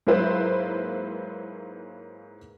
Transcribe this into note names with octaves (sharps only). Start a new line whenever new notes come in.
G#2 F#3 A#3 E4 B4 C5